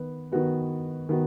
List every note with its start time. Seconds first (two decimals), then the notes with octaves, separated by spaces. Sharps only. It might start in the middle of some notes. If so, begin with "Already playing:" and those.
Already playing: D#3 B3 B4
0.32 D#3 B3 F#4 B4
1.09 D#3 B3 F#4